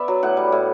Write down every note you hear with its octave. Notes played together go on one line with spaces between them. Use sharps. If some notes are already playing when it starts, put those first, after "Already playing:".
Already playing: B3 D5 E5
F#3
A2 F#5
G3
A2